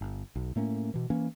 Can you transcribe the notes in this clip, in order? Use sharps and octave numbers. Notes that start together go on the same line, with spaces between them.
G1
B1
A2 A3 A#3 C#4
B2 E3
E3 A#3 C#4